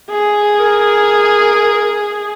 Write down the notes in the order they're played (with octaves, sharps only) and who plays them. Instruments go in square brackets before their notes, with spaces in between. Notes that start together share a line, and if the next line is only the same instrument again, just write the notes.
[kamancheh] G#4
[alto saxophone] A#4